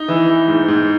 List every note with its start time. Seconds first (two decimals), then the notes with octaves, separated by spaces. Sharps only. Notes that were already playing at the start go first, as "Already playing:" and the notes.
Already playing: D#4
0.08 E3
0.28 E3
0.48 G#2
0.68 G#2